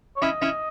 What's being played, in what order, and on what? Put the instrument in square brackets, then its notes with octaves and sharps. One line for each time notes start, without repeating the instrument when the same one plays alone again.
[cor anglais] C#5
[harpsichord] C#4 E4 [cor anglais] D#5
[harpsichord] C#4 E4